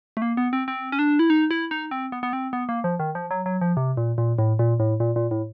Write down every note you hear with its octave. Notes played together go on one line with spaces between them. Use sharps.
A3
A#3
B3
C4
C4
C#4
D4
E4
D#4
E4
D#4
C4
B3
B3
C4
B3
A#3
F3
D#3
F3
F#3
F#3
F3
C3
A#2
A#2
A2
A#2
A2
A#2
A#2
A2